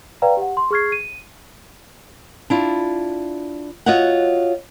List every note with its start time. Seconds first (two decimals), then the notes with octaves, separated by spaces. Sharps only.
0.22 B4 D5 F5 G5 A#5
0.37 G4 F#5
0.57 C6
0.71 G#4 C#6 F6 G#6 C7
0.92 D#7
2.50 D4 E4 F4
3.86 F4 F#4 C#5 D#5 E5 F#5